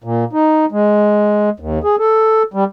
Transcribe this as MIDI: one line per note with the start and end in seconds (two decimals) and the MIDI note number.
0.04 0.24 46
0.33 0.65 63
0.72 1.50 56
1.60 1.79 39
1.84 1.96 68
1.99 2.43 69
2.54 2.64 55